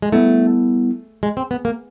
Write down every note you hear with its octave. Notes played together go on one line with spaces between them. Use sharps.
G#3
G3 A3 B3 E4
G#3
C4
B3
A#3